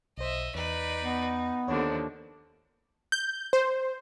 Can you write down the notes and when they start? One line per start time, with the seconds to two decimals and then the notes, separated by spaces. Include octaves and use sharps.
0.18 B1 C5 D#5 E5
0.55 E2 D#4 B4 D5
1.04 B3
1.68 D#2 D3 F3 D4 C#5
3.12 G6
3.53 C5